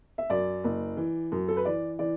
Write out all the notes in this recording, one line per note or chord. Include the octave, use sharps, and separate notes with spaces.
E5
F#2 D5
F#1
E3
F#2
A4
B4
E3 D5
E3 D5